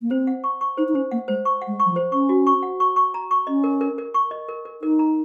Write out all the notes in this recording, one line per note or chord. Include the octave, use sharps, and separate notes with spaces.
A#3
C4 C5
F#5
C#6
C#6
D#4 C5
D#4
C#4 C5
A#3 F#5
G#3 C5
C#6
F#5
G#3
C#6
F#3
F3
C5
C#4 C#6
F#4
C#6
F#5
C#6
C#6
A#5
C#6
C#4 D#5
A#4
A#4
A#4
C#6
D#5
A#4
A#4
D#4 A#4
A#5